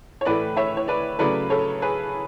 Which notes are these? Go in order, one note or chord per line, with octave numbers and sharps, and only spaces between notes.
C#5
A2 E3 A3 B4 D5
C#5 E5
C#5
B4 D5
C#3 F#3 A3 B4 D5
A4 C#5
G#4 B4